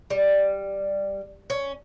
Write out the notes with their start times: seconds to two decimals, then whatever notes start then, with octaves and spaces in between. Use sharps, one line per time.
0.10 G3
1.50 C#4